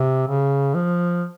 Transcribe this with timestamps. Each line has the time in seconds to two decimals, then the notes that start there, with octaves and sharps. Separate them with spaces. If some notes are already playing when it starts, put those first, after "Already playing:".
Already playing: C3
0.28 C#3
0.75 F3